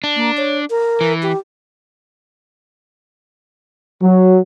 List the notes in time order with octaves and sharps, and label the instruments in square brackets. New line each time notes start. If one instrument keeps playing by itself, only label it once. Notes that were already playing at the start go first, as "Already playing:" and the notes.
[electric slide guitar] D4
[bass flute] A#3
C#5
A#4
[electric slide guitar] E3
[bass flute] G4
[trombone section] F#3